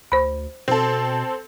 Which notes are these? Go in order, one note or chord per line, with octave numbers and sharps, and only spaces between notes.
D2 C5 B5
B2 C4 A4